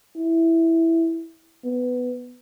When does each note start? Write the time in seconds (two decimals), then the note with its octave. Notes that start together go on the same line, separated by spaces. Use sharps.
0.17 E4
1.65 B3